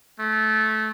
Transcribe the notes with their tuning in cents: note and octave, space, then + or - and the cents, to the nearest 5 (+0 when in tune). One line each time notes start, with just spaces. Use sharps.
A3 -20